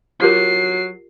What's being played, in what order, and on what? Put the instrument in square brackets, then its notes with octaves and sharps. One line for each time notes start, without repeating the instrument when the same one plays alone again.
[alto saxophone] F#3 [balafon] F4 G4 A#4 [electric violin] C7